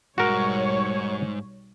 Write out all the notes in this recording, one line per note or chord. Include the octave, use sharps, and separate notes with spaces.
B1 G#2 G3 F#4 A#4 C#5